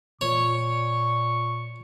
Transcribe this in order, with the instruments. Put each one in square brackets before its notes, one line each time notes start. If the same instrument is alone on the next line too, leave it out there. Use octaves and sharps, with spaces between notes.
[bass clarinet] A#2 [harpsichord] C#5 [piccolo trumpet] C#6